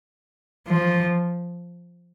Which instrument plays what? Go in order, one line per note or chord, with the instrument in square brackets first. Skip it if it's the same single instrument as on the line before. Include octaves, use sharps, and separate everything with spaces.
[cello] F3